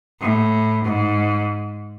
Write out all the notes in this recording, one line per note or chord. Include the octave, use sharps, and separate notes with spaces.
A2
G#2